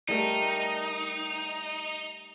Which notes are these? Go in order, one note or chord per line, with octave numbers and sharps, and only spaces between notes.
G3 A3 D#4 A#4